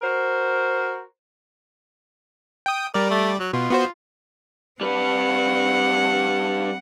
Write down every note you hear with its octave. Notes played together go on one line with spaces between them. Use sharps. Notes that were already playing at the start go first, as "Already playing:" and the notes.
F#4 A#4 C5
G5 D#6
G3 A#4 D5
A3
F#3
B2 F4
B3 F#4 C5
G3 C4 B4 F#5